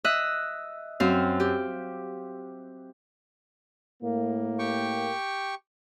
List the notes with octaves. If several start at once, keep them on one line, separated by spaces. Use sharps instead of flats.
D#5 E5 F#6
F#2 C4 F5
G4
A2 A#3
G4 G5 C#6